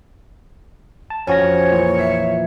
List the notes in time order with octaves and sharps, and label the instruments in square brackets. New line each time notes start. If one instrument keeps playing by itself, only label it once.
[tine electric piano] A5
[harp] F2 G#5 [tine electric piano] C#4 F#4 A#6 [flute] C#5
[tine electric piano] A#2 E3
[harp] E5 C7 C#7